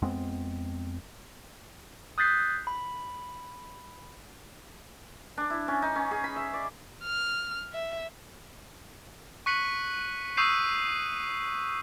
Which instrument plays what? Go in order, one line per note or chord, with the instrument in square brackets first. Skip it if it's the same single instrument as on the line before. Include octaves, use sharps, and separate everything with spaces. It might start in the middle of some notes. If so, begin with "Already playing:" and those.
[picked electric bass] F2 G#3 B3 C4
[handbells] D#6 F#6 G6 A6 B6 C7
B5
[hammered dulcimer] D4
E4
C#4
D#4
C#4
G#4
B5
E5
D5
[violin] F6
E5
[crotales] C#6 F#6 B6 C#7 D#7 F#7
C#6 D#6 E6 G6 C7 D#7